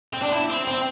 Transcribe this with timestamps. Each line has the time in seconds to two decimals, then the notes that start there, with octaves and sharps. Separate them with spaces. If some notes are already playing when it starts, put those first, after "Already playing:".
0.14 C4
0.23 D4
0.33 E4
0.50 C4
0.67 C4